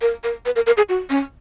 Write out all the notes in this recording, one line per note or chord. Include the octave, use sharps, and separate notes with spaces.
A#4
A#4
B4
A#4
A#4
G#4
F#4
C#4